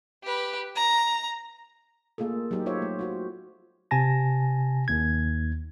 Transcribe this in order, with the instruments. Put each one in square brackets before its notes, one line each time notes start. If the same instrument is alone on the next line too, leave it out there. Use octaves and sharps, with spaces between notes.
[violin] G4 B4
A#5
[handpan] A3 A#3 F4 G#4 A4
F#3 D#4 G4
D#4 F4 C5 C#5 E5
A3
F4 F#4 C5
[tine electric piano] C3 G#5 A5 A#6
D#2 G#6